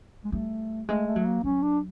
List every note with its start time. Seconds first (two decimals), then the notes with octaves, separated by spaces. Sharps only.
0.25 G#3
0.32 G3 A3
0.88 G#3 A3
1.06 A3
1.16 F#3
1.25 A#3
1.44 F#3 C#4
1.62 D4